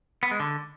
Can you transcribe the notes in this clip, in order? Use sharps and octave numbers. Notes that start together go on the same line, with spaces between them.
B3
G#3
D3